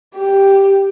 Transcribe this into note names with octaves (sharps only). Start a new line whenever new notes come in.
G4